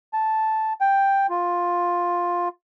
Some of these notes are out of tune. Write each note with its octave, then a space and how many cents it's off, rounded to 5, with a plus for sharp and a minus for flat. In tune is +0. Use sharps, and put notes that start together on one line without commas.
A5 -5
G5 +5
F4 +10